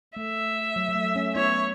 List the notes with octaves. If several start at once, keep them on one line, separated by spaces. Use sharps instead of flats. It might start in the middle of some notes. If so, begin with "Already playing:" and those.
A3 E5
F#3
F#3
A3
A3 C#4
B3 E4 C#5